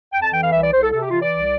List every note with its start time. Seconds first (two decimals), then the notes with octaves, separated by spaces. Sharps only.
0.12 F2 G5
0.22 A5
0.32 E3 G5
0.42 F5
0.52 C2 E5
0.62 D5
0.71 C2 C5
0.81 A4
0.92 C3 A4
1.01 G4
1.10 E3 F4
1.21 D5
1.30 C2